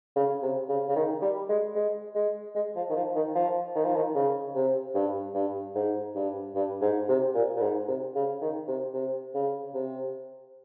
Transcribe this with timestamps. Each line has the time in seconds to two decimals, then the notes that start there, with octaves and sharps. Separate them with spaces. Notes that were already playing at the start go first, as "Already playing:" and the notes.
0.16 C#3
0.42 C3
0.69 C#3
0.89 C#3
0.96 D#3
1.22 G3
1.49 G#3
1.75 G#3
2.15 G#3
2.55 G#3
2.76 F3
2.90 D#3
2.96 F3
3.15 D#3
3.35 F3
3.76 D#3
3.85 F3
3.96 D#3
4.15 C#3
4.55 C3
4.95 G2
5.34 G2
5.75 G#2
6.15 G2
6.55 G2
6.82 G#2
7.09 C3
7.34 A#2
7.56 A#2
7.61 G#2
7.88 C3
8.15 C#3
8.41 D#3
8.67 C3
8.94 C3
9.35 C#3
9.74 C3